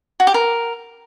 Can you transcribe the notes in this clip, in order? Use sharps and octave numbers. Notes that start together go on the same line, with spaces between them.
F#4
G4
A#4